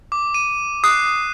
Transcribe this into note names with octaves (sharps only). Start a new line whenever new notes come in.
D6
D#7
D6 D#6 F#6 C7